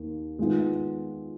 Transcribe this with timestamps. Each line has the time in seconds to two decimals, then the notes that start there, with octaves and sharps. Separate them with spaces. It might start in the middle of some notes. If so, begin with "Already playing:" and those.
Already playing: D#2 D#3 A#3
0.39 D#3 G#3 B3 F4